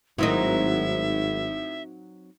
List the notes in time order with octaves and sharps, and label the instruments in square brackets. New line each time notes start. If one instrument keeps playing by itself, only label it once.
[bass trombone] G#1 [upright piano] A2 D#3 [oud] F#3 C4 D#4 [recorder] E5